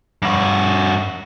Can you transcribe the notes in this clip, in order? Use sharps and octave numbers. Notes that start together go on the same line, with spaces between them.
G2 F#4